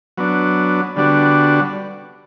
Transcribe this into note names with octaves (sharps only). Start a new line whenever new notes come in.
F#3 B3 D4
D3 G3 B3 D4 F#4